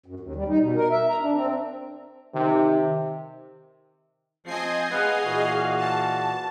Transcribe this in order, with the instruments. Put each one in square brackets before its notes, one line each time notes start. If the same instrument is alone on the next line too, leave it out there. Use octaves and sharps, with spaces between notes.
[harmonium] F#2
D#2
G3
D#4
B2
A#4
E5
A#5
D4
C4
[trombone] C3 [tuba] D#3
[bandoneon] F3 [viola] C4 [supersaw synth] D#5 G#5 C7
[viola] G#4 F5 [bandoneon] B4 F#5
[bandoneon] A#2 E3 F#4
[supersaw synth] A5